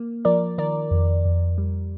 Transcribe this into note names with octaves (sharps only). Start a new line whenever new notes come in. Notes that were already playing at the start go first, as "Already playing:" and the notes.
Already playing: A#3
F3 A#4 D5
D#3 A#4 D5
F2
F2
G3